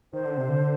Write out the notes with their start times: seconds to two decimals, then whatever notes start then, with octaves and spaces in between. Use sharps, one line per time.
0.13 D#3 C5
0.25 D3
0.38 C3
0.49 D3